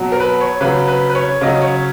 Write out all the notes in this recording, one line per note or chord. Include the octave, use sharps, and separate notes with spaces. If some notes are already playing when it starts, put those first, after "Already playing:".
Already playing: B2 F#3
A#4
B4
C#5
C#3 F#3 B4
B4
B4
C#5
C#3 F#3 D#5
C#5